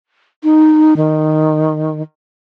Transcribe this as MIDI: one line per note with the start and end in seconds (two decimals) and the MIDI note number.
0.44 0.94 63
0.97 2.02 51